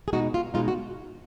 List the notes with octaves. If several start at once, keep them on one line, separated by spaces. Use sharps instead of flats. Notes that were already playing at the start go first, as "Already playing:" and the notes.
G#4
B2 G#3 D#4 F#4
F4
B2 G#3 D#4 F4
F#4